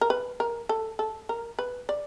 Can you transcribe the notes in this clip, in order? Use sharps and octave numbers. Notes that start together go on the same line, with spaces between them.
A#4
B4
A#4
A4
A4
A#4
B4
D5